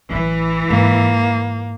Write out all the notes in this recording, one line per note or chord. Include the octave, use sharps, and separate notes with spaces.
A1 E3 F#3
G#2 A#3